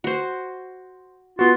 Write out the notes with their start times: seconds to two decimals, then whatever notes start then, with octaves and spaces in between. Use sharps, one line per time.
0.04 F#4 C5
1.39 B3 F4 F#4